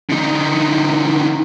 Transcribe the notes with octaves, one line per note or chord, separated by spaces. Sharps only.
D3 D#4